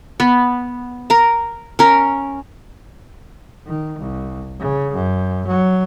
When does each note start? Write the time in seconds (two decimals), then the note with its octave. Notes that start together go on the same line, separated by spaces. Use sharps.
0.20 B3
1.10 A#4 A#5
1.79 C#4 A#4
3.67 D#3
3.99 C2
4.59 C#3
4.94 F#2
5.47 F#3